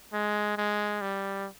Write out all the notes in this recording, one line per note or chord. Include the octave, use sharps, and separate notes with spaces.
G#3
G#3
G3